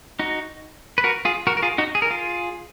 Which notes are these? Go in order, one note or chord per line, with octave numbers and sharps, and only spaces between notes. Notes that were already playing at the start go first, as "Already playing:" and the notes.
D#4 F#4
B4
F#4 A#4
F4 G#4
F#4 A#4
A#4
F4 G#4
D#4 F#4
G#4
A#4
F4 G#4